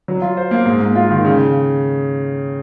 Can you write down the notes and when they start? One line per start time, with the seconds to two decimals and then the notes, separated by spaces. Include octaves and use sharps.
0.08 F#3
0.22 F4
0.37 C5
0.51 A#3
0.66 G#2
0.81 A#3
0.96 F4
1.09 D#3
1.25 C#3